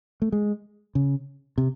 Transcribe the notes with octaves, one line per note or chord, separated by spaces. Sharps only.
A3
G#3
C#3
C3